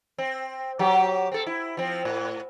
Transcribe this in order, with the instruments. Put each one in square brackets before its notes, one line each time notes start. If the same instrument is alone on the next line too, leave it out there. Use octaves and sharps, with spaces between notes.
[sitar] C4
F#3 G4
C4 A4
E4
F3 C4
A2